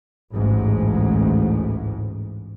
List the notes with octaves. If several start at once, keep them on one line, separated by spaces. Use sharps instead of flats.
A1 D2 G#2